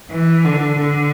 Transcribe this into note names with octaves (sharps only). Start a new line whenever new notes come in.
E3
D3
D3